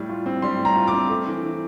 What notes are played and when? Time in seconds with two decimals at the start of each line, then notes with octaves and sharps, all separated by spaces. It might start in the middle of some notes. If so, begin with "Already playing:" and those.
Already playing: A2 G3
0.09 F4
0.26 C4
0.42 G3 C6
0.59 A2
0.65 A#5
0.76 F4
0.88 D6
0.93 C4
1.09 A3
1.27 E3
1.43 E3